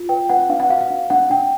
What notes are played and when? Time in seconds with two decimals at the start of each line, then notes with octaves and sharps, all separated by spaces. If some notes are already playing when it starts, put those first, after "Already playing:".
Already playing: F4
0.09 B4 G5
0.29 B4 F#5
0.49 D4 F5
0.60 F#5
0.70 F#4 F5
0.81 F5
0.90 D4
1.10 D4 F#5
1.30 D4 G5